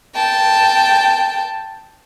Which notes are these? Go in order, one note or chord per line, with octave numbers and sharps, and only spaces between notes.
G5 A5